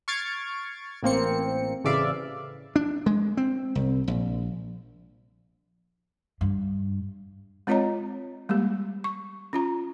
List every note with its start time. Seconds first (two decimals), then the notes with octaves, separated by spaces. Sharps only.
0.08 C#6 F6 G#6 A6 C7 D7
1.03 A1 A#3 C4 C#7
1.84 A1 C#3 E3 D5 E5 F5
2.76 D4
3.06 G#3
3.37 C4
3.75 C2
4.08 A#1
6.41 G2
7.67 G#3 C4 F4 C#5 D#5 A#5
8.49 G3 G#3 A#3 G4
9.04 C#6
9.53 C#4 F4 A#5